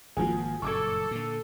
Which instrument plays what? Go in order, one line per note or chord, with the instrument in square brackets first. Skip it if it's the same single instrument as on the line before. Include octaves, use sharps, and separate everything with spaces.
[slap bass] G#1 A#3 [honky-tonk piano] F3 F#4 G#4
[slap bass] F#1 G2 A#2 [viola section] A4 [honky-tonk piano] C#6 D6 G#6
[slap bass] A#2 D3